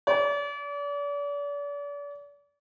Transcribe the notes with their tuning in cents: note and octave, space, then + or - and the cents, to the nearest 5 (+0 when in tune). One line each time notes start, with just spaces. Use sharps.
D5 -40